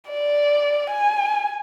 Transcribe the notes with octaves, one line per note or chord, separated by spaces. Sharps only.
D5
G#5